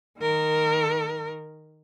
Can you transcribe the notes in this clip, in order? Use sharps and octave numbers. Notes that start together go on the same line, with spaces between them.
D#3 A#4